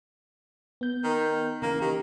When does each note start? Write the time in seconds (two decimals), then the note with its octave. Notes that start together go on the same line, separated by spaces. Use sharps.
0.81 B3 G6
1.04 D#3
1.62 C#3 E3 A#3
1.82 D#3 G4